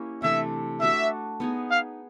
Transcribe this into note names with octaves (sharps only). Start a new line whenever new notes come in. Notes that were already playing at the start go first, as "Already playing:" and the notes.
Already playing: A#3 C#4 E4 G4
C3 E3 A3 D4 E5
A3 D4 F#4 E5
B3 D#4 G#4
F5